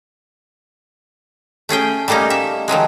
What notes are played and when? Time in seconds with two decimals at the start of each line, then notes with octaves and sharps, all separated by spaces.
1.69 A3 C#4 G#4 G5
2.08 G3 A3 A#3 C#4 D#4
2.30 E5
2.68 D#3 F3 F#3 G#3